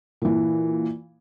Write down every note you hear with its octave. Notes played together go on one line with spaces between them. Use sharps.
A#2 E3